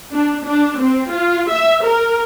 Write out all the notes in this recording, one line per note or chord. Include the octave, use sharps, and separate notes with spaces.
D4
D4
C4
F4
E5
A#4